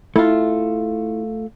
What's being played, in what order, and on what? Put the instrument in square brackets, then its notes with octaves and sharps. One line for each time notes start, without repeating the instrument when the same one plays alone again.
[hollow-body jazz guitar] A3 F4 [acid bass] E4